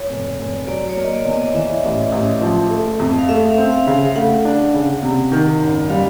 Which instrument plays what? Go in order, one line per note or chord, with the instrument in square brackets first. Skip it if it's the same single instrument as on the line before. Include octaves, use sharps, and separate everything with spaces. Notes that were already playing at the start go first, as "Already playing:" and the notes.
Already playing: [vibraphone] C#5
[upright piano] F1
F1
[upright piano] F#3 [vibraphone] D5
[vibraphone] C#5
[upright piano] A#3
[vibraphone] D#5
D5
[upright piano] E2
[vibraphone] D#5
[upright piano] E3 [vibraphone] E5
[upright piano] A1
A1
F3
A3
F2
[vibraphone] F5
[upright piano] A3 [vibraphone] E5
[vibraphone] F5
[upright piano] C4
[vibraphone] F5
[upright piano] C#3
[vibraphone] F5
[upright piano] A3 [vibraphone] F#5
[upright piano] D4
C#3
C3
D#3
F#1
[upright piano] G3 [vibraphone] F5